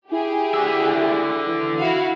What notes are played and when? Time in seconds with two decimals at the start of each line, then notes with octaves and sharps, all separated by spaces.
0.12 E4 G4 G#4
0.54 D3 E5
1.47 E3
1.79 E4 F#4 F5